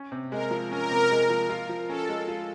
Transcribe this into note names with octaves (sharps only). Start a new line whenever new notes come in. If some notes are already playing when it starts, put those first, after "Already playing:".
Already playing: C#4
C3
G#3 A#4
F3
C#4 A#4
C3
G#3
F3
F4
F3
C#4 A4
G#3
F4